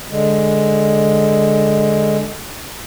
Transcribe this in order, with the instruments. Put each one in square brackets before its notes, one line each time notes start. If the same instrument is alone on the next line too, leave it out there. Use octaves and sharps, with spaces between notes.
[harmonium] D3 G#3